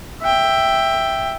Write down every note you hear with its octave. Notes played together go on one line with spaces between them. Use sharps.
E5 G5